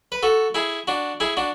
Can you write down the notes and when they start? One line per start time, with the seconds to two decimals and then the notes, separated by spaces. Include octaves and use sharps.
0.12 B4
0.23 F#4 A4
0.55 E4 G#4
0.88 D4 F#4
1.20 E4 G#4
1.37 D4 F#4